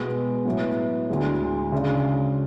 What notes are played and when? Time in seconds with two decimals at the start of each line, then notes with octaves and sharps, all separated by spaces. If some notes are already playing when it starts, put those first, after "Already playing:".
Already playing: B2 G#3 B3
0.45 A2 F#3 B3 E4
1.09 D2 D3 G#3
1.72 C#3 G#3 D4